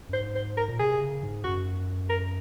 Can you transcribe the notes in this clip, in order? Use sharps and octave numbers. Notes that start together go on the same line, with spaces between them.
F#2
G#2 C5
C5
A#4
A#2
C3 G#4
C#3
G#2
F#2 F#4
A#4